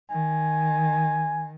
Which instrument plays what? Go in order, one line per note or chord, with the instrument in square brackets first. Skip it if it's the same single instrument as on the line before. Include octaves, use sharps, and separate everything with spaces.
[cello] D#3 [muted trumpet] G#5